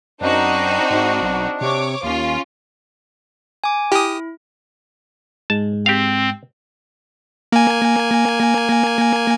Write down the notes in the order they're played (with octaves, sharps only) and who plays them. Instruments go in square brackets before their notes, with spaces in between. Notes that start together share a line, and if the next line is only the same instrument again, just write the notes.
[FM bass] F#2 [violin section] C4 D#4 F#4 [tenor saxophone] D4
[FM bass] G#2
B1
[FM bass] C3 [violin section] C#5 D6
[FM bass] D#2 [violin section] C#4 F4
[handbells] G#5 D6
[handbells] E4 [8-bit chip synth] G4 D#6
[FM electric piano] G#2 G#3 [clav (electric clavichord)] A5
[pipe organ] C4 [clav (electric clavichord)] G4 F5
[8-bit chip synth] A#3 G#5